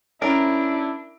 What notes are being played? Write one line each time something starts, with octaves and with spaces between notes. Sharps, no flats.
C#4 D4 E4 A#4 D7